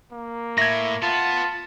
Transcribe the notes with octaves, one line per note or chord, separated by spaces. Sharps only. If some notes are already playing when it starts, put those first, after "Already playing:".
A#3
A2 E5 G#6 A#6
B3 F4 A5